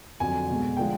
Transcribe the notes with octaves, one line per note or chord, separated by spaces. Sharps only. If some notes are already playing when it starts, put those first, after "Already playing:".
F2 D3 F#3 G#5
B2 G#3
D3 F3 G#3 G5